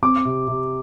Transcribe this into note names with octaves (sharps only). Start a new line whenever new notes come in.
C4 D6
C3
C3